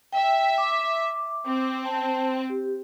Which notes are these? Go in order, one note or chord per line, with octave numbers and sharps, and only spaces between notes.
E5 G5
D6
C4
A5
G4